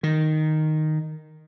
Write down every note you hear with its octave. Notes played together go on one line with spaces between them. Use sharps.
D#3